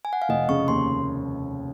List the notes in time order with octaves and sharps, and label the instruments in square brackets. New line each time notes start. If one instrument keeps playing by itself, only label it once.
[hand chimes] G#5
F#5
F5
[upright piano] F1 [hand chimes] D#5
[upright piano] C#3 [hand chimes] C#6
[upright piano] D#2 [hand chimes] C6